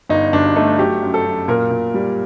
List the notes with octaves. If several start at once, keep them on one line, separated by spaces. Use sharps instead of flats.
G1 D#4
G1 D4
A3 D#4
F#3 G4
F#2
A4
F#2
A#2 A#4
A#2
G3